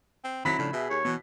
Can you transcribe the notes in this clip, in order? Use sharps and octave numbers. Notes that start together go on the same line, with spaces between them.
C4
D#3 F#3 C4 E4 B5 B6
A2 C#3 F3 D4
B2 G#4 E5
D#2 C#5
B2 E3 B3